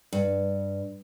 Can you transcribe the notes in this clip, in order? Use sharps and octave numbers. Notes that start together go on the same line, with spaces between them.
G2